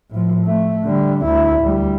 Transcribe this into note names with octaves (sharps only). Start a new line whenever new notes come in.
A2 F3
A3
D3 G3
D2 E4
D2 G3